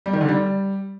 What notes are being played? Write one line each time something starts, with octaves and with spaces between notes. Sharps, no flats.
G3
D#3
D3
G3